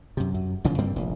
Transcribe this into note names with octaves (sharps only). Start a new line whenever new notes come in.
F#2 C3
F#2
B1 A#2 C#3 F3
G2 G3 A#3 C4
F1 A#1